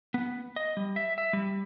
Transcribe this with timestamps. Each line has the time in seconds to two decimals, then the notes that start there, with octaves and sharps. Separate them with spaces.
0.14 B3
0.56 D#5
0.77 G3
0.96 E5
1.18 E5
1.33 G3